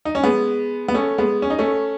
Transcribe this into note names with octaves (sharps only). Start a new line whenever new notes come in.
D#4
C#4
G#3 B3
B3
A3 C#4
G#3 B3
C#4
D#4
A3 C#4